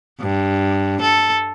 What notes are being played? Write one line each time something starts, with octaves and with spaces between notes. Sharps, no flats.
G2
A4